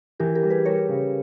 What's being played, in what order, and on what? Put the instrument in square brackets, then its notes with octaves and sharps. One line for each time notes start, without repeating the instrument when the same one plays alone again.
[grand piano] E3 [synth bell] G4 A#4
[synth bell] G4 A#4
[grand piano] G3
[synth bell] G#4 B4
[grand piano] G3 [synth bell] A#4 C#5
[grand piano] C#3